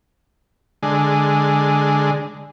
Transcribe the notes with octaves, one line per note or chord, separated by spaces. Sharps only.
D3 G#3